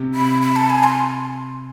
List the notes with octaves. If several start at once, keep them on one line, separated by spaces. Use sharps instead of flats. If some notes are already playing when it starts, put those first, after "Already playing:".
Already playing: C3
B5
B5
A5
G#5
C6